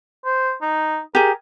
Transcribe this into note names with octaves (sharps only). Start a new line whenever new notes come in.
C5
D#4
G4 G#4 A#4